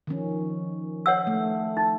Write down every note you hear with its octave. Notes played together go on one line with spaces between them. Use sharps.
D#3 F3 C#4
C#5 F#5 E6
A3
D#4